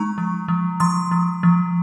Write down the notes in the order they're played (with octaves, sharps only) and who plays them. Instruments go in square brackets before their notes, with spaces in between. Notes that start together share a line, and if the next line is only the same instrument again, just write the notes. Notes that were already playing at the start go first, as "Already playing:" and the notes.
Already playing: [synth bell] G#3 D#4 A#5 C#6
F3
F3
F3 C6 D#6
F3
F3